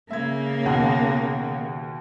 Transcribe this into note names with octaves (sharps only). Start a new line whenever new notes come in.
C#3 A#3 E5 G#6
D#2 B2 F#5